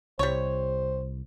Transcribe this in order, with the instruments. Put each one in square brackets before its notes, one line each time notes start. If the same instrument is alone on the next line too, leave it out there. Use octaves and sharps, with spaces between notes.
[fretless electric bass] C2 [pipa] G3 C#5 [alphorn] C5